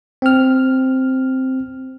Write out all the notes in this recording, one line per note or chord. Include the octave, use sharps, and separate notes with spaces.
C4 F6